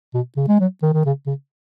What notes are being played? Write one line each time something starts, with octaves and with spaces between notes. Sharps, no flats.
B2
C#3
G#3
F#3
D#3
D#3
C#3
C#3